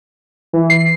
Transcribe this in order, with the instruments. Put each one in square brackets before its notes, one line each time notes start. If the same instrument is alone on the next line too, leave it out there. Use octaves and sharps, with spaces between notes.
[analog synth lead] E3
[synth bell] C7